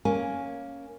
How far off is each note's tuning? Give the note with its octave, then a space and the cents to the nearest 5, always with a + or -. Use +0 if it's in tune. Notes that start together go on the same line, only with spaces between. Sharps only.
A#3 +0 C#4 +0 G#5 +0